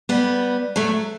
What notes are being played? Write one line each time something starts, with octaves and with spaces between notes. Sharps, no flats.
G3 B3
F#3 A3